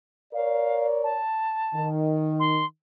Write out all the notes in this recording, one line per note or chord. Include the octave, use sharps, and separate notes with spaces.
A#4 C#5 D5 F5
A5
D#3
C6